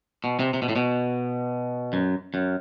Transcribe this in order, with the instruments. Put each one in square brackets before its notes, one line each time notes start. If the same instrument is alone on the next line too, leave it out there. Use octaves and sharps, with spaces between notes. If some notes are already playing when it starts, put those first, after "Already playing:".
[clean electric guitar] B2
C3
C3
B2
A2
B2
F#2
F#2